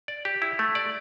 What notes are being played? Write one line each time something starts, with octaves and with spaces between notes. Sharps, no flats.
D5
G4
E4
A3
D5